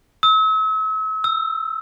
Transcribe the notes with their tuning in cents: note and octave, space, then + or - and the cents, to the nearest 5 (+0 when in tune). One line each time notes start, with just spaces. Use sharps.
E6 -40
E6 +10